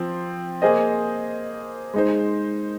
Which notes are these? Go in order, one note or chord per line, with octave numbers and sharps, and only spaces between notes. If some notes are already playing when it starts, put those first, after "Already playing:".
Already playing: F3 C4
A#3 G#4 C5 D#5
G#3 D#4 C5